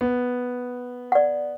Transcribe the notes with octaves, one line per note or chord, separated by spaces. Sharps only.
B3
D5 F#5